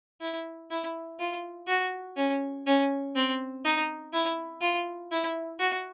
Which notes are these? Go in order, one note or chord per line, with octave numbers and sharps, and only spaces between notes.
E4
E4
F4
F#4
C#4
C#4
C4
D#4
E4
F4
E4
F#4